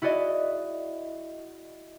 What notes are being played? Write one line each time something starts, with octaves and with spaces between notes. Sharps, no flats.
E4 F#4 G#4 D5 D#5